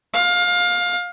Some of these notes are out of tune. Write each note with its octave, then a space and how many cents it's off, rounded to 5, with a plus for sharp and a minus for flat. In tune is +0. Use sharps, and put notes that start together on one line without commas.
F5 +25